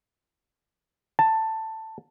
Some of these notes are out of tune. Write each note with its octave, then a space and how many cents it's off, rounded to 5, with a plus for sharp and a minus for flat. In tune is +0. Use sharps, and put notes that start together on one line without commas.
A5 +10